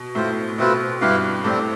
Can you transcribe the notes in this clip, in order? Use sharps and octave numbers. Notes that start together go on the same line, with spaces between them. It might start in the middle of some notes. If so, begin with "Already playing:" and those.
Already playing: B2
A2 F4 C5 E5
B2 A3 C4 F4 B4
G2 E4 G4 B4 F5
A2 G3 C4 G4